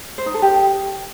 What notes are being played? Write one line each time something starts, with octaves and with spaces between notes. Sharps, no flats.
C5
D#4
A4
G4